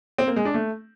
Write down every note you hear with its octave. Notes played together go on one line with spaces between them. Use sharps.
C4
A#3
G#3
D4
A3